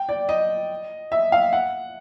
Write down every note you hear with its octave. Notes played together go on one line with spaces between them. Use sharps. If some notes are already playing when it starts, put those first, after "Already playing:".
Already playing: G5
D5
D#5
E5
F5
F#5